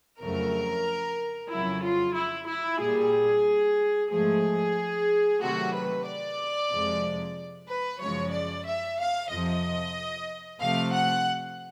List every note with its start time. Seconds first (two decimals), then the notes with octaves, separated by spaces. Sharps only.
0.22 F2 C#3 F#3 A3 A#4
1.52 F2 C#3 F#3 E4
1.84 F4
2.16 E4
2.49 E4
2.81 A#2 G3 G#4
4.11 G#2 F3 A3 G#4
5.41 C3 D#3 F#3 A3 F#4
5.74 B4
6.06 D5
6.71 F2 C3 F3 G#3
7.68 B4
8.01 F#2 C#3 F3 G#3 C#5
8.33 D5
8.66 E5
8.98 F5
9.30 F2 C3 F3 D#5
10.60 C3 F3 A3 F5
10.92 F#5